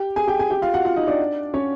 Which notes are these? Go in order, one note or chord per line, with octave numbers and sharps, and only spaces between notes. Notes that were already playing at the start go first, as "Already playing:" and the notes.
Already playing: G4 G5
G#4 G#5
G4 G5
G#4 G#5
G4 G5
F4 F5
F#4 F#5
F4 F5
D#4 D#5
D4 D5
C#4 C#5